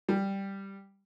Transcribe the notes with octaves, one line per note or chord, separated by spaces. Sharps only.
G3